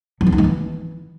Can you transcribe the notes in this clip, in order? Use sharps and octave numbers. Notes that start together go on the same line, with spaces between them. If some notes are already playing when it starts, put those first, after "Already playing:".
F#3
C4
D#4
G#3
E3